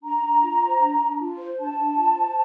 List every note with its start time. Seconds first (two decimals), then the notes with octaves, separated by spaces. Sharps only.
0.03 D4 A#5
0.23 D4
0.43 F4
0.62 C5
0.81 D4
1.00 D4
1.19 F4
1.39 C5
1.58 D4 A5
1.78 D4
1.98 F4
2.16 C5